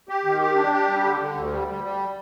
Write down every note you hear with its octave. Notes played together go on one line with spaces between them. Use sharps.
G4
D#3
G4
D4
G4
G3
D3
D3
D2
G3
G3
G3